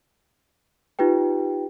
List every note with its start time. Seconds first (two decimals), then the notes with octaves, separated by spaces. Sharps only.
0.99 D#4 F4 G4 B4 G5